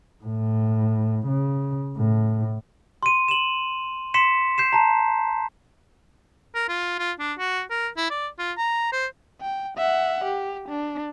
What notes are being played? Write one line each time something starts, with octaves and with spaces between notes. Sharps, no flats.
A2
C#3
A2
C6 D#7
E7 F#7
C6 B6 C#7 E7
G6 C7 E7
A5 A#5
A#4
F4
F4
D4
F#4
A#4
E4
D5
F4
A#5
C5
G5
E5 F#5
G4
D4